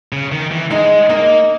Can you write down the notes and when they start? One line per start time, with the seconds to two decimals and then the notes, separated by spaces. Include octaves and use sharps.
0.13 C#3
0.32 D#3
0.51 E3
0.71 G#3 D#4
1.09 A#3 D#4